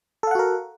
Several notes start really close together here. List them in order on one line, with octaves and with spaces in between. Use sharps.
A4 F5 F#5 F#4 A#4